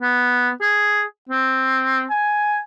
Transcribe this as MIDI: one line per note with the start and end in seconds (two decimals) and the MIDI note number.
0.01 0.50 59
0.61 1.03 68
1.29 2.04 60
2.10 2.59 80